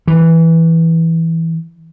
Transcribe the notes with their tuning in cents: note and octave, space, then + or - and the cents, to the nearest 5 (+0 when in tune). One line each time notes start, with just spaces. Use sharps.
E3 -5